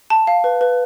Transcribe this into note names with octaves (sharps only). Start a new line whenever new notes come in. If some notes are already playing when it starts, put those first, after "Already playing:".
A5
F5
B4
B4